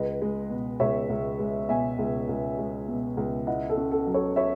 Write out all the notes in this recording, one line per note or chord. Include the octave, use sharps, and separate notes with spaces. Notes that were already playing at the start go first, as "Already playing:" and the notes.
Already playing: C#2 B4 D#5
G#3
B2
C#2 C#5 E5
C#2
G#3
B2 E5 G#5
C#2
C#2
G#3
B2
C#2
E4 D#5 F#5
A4
C#4
A4
F#3
A4 C#5
C#5 E5